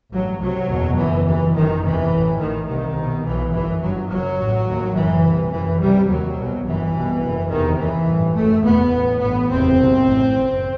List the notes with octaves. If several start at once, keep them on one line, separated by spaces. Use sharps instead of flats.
A1 G2 F#3
C2 C3 F#3
F#1 E2 B2
F#1 F#2 E3
D#2 E3
G1 F#2 D#3
F#1 E2 C3 E3
A1 A2
A1 A2 D#3
C2 C3 D#3
C2 B2
B1 B2 E3
G1 F#2 E3
G1 G2 F#3
F#1 F#2 F#3
A1 A2
D#2
F#1 F#2 E3
C2 C3
F#1 F#2 E3
C2 C3 G3
D#2 F#3
C2 B2
G1 F#2 E3
C2 B2
F#1 F#2
F#1 E2 C3 D#3
D#2 E3
A1 G2
F#1 F#2 A3
F#1 E2 B2 B3
A1 A2
A1 G2 B3
F#1 E2 C3 C4
C2 B2
A1 A2
F#1 F#2